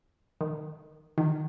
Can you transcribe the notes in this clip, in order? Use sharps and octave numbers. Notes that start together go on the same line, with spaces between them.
D#3
D#3